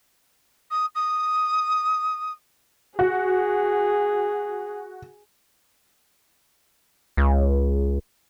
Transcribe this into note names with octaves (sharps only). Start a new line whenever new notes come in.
D#6
D#6
F#4 G#4
C#2